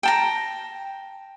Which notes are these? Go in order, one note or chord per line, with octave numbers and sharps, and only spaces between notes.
G5 A5 A#5